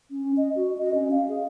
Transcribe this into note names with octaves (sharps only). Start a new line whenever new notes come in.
C#4
D#5
F#4
D#5
C#4
F5
G#4